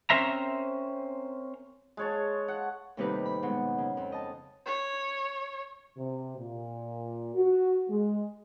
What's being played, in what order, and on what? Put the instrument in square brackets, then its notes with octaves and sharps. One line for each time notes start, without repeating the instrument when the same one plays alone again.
[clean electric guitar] C4 C#4 A#4 C5 E5 A#5
[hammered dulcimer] G#3 C#5 A5
F#5
[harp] D#2 A2 C3 G3 D#4 B4
B5
G#2 B2 F#3
C#3
F2
D#5 A5
[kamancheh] C#5
[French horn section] C3
A#2
F#4
G#3